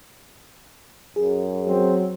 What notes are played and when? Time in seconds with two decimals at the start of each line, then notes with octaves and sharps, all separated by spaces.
1.16 F#2 G#4
1.67 F#3 C4